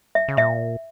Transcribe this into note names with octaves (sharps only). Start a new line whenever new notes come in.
E5
C#3
A#2 E5